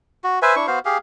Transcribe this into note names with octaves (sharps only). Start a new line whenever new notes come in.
F#4
B4 C5 E5 G#5
D4 E4 C#6
B3 F#4 C5 F5
G4 G#4 F5